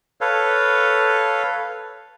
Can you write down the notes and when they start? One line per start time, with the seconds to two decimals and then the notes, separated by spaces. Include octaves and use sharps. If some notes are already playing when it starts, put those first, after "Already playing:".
0.21 A4 B4 C#5 F5